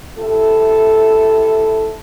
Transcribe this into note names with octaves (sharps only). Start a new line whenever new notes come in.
C3 E4 A4